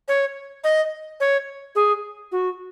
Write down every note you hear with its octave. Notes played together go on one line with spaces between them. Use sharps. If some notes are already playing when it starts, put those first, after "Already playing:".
C#5
D#5
C#5
G#4
F#4